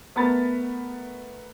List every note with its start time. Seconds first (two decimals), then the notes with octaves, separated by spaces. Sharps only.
0.16 A3 B3 A#4 A5 B5 A6